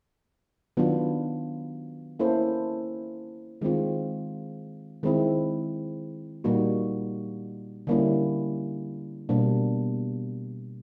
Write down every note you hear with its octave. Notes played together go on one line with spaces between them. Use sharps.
D#3 F#3 B3 D4 F4
A#3 C#4 E4 A4 C5
D#3 G#3 C4 F4
D#3 G#3 C4 E4
A#2 G3 A#3 D#4 F#4
D3 G3 A#3 C#4 E4
B2 G3 A#3 D4